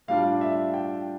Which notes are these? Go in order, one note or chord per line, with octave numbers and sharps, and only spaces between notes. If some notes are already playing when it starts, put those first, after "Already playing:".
A2 G3 D4 F4 F5
E5
G5